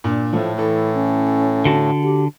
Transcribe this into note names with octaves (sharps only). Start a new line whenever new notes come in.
A#2 D4
A2 F3 A3
E3 E4 A4
C#4
D3 F#4 A5
G4